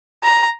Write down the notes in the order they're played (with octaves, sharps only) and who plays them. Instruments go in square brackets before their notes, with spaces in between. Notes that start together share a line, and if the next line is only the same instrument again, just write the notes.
[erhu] A#5